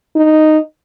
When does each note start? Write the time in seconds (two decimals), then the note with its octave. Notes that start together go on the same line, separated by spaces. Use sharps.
0.16 D#4